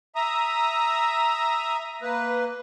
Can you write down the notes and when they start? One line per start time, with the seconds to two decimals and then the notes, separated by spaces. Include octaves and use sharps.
0.15 E5 A#5 D#6
2.02 A#3 B4